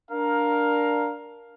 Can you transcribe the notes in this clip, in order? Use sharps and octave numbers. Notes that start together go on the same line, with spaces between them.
D4 A#4 F5